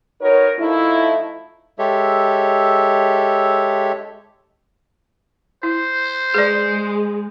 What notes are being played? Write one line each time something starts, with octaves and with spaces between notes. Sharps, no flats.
D#4 F#4 A#4 B4 C#5
F3 A3 D#4 E4
G#3 G4 A4 C#5 E5
E4 C5
G#3 G#4 B4 D5